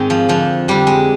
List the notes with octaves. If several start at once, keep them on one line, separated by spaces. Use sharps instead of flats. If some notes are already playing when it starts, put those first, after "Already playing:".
Already playing: G#2 D#3 G#3 C4 D#4
F3
F2 D3 F3
F2 D3 G3
G#3